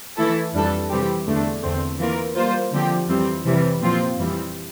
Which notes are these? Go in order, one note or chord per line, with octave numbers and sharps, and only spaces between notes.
E3 A3 E4 A4
F2 E3 G3 D4 A4
C3 E3 G3 C4 G4
E2 D3 A3 D4
E2 D3 A3 C4
E3 A#3 F4 A#4
G3 A#3 F4 C5
D3 F3 C4 G4
F2 E3 G3 C4
C3 E3 G3
A#2 F3 C4 F4
F2 E3 G3 C4